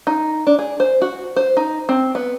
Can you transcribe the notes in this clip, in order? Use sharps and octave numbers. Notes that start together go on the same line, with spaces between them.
D#4
D4
G#4
C5
F#4
C5
D#4
C4
B3